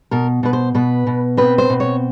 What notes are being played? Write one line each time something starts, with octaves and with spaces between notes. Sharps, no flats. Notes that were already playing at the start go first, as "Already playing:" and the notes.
B2 A#4
B2 B4
C5
B2 B4
B2
C4 B4
C5
B2
C#5